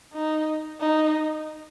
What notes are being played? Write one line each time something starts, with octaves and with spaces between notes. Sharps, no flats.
D#4
D#4